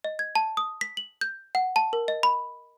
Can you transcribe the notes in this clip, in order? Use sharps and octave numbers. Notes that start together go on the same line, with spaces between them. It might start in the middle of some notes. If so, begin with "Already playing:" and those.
D#5
G#6
A5
D#6
B6
F#7
G6
F#5
A5
A#4
D#5
B5